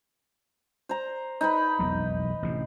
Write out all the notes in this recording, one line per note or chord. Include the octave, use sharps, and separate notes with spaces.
C5 A#5
D#4 B4 B5
E1 B1 F2
A1 C3